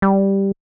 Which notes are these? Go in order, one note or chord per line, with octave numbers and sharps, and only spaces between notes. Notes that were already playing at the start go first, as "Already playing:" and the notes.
G3